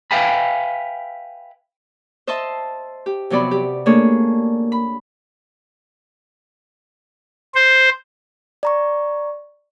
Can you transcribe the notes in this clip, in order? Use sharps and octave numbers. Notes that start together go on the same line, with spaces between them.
B4 E5 F5 G5 G#5 B5
C5 D#5 E5 A5 C6
G4
C3 F3 F#3 B3 D5 B5
G4
A3 A#3 D4 G#4 C#5
B5
C5
D5 A#5 C#6